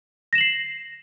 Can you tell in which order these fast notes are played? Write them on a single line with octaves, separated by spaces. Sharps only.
A#6 E7 F#7 C7